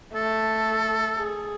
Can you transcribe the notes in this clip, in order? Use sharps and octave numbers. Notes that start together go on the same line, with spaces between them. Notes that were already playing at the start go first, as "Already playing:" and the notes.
A3 A4
G#4